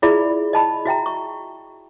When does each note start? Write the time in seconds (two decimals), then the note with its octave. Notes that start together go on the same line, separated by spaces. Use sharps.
0.02 E4 F4 G#4 D5 E5 B5
0.53 D#5 A5 B5
0.85 F#4 E5 G5 A#5
1.06 C#6